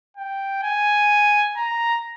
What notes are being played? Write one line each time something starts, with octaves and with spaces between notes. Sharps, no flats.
G5
G#5
A#5